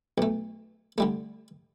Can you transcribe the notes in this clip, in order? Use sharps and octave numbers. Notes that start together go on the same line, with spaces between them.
B1 A3
D3 G3 A3